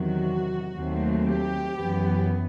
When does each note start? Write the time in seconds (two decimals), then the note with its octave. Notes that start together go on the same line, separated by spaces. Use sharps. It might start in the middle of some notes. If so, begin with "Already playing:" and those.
Already playing: E2 C3 D#3 F#3 F#4
0.75 D#2 D#3 F#3 A3 C4
1.25 G4
1.76 F#2 E3 B3